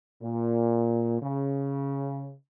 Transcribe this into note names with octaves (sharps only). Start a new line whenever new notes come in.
A#2
C#3